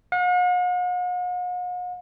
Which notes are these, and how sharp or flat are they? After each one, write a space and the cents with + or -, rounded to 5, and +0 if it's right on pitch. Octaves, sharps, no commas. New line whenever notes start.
F#5 -45